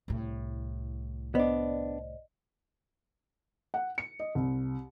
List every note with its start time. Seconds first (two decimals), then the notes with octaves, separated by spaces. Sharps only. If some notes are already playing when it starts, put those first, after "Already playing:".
0.08 C2 A2
1.35 B3 D4 C5 D5 D#5
3.74 F#5
3.98 C#7
4.20 D#5
4.35 C2